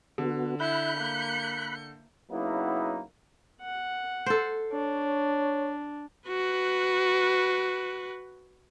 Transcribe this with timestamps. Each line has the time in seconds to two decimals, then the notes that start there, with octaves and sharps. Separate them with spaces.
0.18 D3 B3 F#4
0.60 E4 B5 F#6 G6 C#7
0.97 A#3
2.31 C#3 F#3 A#3 B3 D#4 E4
3.61 F#5
4.26 A4 C5
4.72 D4 C#5
6.28 F#4 B4